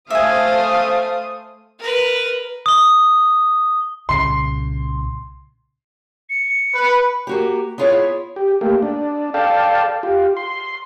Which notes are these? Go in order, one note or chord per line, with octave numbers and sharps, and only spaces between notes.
A3 C5 E5 F5 G#5 D#6
A#4 B4
D#6 G7
C2 A#2 C#3 C6 C7
C#7
B4
A#3 F#4 G4
B3 E4 F4 G#4 C#5
G4
A3 A#3 G4
D4
A4 D5 F5 G5 A5
F4 G4
C6